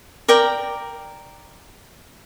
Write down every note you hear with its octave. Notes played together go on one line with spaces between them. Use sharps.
A#4 D5 G5 A#5